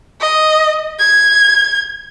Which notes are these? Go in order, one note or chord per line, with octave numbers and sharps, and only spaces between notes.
D#5
G#6